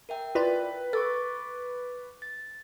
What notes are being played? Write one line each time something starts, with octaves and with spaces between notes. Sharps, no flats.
A#4 E5 G5
E4 F4 B4 D5
A4 C#6 D6 A6
A6